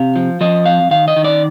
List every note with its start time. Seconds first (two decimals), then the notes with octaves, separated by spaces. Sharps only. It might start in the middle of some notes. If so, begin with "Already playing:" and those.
Already playing: C3 F5
0.16 F3
0.41 F3 D#5
0.66 F2 F5
0.91 D#3 F5
1.08 D#5
1.16 D#3
1.24 D5